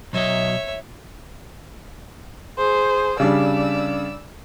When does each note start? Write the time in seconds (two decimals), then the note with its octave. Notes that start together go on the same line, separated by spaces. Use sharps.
0.13 B1 F#3 C#5 D#5 E5
2.58 G#4 C5
3.20 C#3 G3 D4 D5 E6